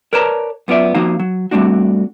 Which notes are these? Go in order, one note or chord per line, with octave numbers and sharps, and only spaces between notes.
A#4 B4 C#5 D5 A5 A#5
F#2 B3 F4 D5 E5
F3 A#3 D#4 F#4 F5
F#3
G3 A3 C4 D4 F#4